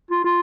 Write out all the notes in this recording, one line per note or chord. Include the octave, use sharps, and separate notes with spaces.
F4
F4